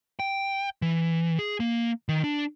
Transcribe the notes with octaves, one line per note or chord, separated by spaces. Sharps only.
G5
E3
G#4
A#3
D#3
D4